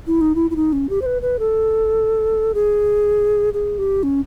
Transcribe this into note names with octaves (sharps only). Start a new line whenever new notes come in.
E4
D#4
E4
E4
D#4
C#4
G4
C5
B4
B4
A4
G#4
G#4
G4
C#4